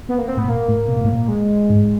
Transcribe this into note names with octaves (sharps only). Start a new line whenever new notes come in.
B3
A#3
C4
A2 B3
A#2 A#3
A2
B2
A#2
A2
A#2
G#3
G#2